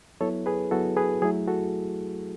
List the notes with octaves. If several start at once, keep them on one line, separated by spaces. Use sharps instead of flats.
F#3 B3 E4 A4 C#5
G#4 B4
F#3 B3 E4 F#4 A4
G#4 B4
F#3 A3 E4 G#4
F#4 A4